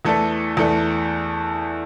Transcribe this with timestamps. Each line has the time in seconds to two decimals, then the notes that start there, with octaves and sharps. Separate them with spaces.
0.05 E2 E3 A3 D4 A4
0.57 E2 E3 A3 D4 A4